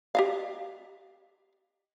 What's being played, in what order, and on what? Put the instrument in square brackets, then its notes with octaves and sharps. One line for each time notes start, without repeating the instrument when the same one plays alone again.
[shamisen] G4 D#5 F5